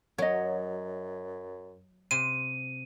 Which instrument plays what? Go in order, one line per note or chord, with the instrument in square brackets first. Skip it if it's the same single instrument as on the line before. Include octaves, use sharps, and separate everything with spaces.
[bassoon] F#2 [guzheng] F#3 [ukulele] C#5 D#5
[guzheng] C3 C6 [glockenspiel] D#7